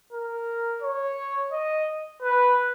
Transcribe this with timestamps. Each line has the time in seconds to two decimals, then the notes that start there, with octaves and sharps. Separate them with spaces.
0.13 A#4
0.82 C#5
1.52 D#5
2.23 B4